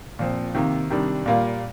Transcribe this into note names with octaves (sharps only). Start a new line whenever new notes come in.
A#2 F3 C4
C3 D#3 A#3
C3 D#3 G3 D4
A#2 G3 A#3 F4